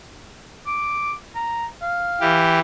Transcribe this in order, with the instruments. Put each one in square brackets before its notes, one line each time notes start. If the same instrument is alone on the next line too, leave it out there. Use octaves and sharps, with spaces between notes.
[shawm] D6
A#5
F5
[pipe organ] E3 G4